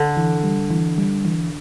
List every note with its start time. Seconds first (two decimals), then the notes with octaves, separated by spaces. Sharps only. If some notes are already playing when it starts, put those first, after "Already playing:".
Already playing: D3
0.17 E3
0.44 G3
0.71 E3
0.98 G3
1.25 E3